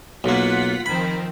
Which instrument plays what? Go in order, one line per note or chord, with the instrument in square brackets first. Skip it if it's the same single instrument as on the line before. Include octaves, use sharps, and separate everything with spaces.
[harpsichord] B1 A#3 [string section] F4 F#5 B6
[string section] D#3 F3 C4 [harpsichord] B5